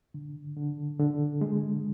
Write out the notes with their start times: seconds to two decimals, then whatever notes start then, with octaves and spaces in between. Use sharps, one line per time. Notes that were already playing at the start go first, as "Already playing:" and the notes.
0.14 D3
0.57 D3
1.00 D3
1.41 G#3